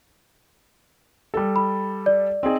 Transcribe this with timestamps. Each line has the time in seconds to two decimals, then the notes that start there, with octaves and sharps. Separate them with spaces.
1.34 G3 A4
1.56 B5
2.06 D5
2.43 C4 D#4 G#4